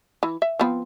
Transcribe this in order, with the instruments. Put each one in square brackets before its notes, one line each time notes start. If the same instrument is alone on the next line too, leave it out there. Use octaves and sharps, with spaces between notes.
[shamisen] E3
E5
F3 B3 C4